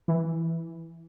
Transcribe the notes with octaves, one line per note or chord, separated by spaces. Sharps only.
E3